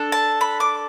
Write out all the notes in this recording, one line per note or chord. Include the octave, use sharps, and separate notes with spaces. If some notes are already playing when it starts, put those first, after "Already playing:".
Already playing: D4 A4
A5
B5
D6